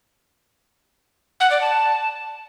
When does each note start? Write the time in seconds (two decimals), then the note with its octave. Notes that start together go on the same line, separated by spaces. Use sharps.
1.40 F#5
1.51 D5
1.61 A5